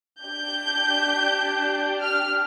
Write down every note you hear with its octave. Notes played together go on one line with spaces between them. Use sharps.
D4 G4 G6
F6